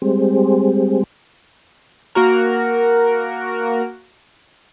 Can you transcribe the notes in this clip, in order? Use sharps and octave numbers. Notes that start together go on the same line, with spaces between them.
G3 G#3 C4
A#3 F#4 A#4